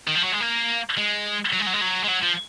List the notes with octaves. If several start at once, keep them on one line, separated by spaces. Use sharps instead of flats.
D#3
F3
F#3
G#3
A#3
G#3
F#3
G#3
F#3
G#3
F#3
G#3
F#3
F3